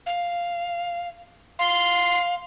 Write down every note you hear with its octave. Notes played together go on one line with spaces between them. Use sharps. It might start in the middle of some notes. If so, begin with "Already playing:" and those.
F5
F5 C6